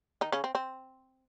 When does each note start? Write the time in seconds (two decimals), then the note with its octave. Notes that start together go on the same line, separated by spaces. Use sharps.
0.21 D#3 D#4
0.32 C#3 C#4
0.44 C4
0.55 C4